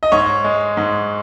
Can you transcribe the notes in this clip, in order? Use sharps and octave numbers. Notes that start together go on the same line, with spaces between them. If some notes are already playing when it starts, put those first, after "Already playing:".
D#5
G#2 C#5
G#3
G#2